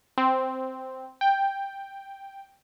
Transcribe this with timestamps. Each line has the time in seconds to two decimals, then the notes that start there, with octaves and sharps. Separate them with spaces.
0.18 C4
1.21 G5